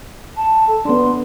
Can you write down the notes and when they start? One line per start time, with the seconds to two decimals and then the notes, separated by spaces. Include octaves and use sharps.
0.37 A5
0.68 A4
0.85 B3 D4 C6